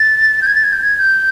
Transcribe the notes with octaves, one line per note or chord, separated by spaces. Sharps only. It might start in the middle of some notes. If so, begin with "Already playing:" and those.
Already playing: A6
G6
G#6
A6
G#6
G6
G#6
G6